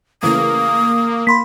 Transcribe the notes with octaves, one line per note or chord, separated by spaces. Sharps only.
C#3 E3 A3 A#3 D#6
A#3 B5 C6 B6